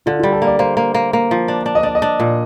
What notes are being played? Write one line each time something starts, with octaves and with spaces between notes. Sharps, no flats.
D3 F4
G3 F4
A4
A#3 D5
A#3 C5
A#3
A#3
A#3
F3
D4
D4
D#5
D4 D5
D#5
D4
A#2